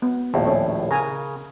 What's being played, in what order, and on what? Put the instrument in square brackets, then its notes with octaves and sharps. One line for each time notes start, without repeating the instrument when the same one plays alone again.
[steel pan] B3
[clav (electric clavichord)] A#1 D#2 A2
[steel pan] C#4 A4 C#5
[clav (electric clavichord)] C#3 [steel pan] A#4 G#5 A#5